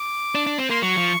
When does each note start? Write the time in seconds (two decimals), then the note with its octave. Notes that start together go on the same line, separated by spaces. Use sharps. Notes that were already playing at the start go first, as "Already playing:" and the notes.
Already playing: D6
0.35 D4
0.46 D4
0.58 C4
0.70 A#3 C6
0.82 F#3 C#6
0.97 F3